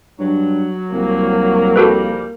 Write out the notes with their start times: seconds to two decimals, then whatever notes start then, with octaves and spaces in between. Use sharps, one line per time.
0.19 G2 F#3
0.93 C2 A#3
1.76 F3 G3 F#4 A4 B4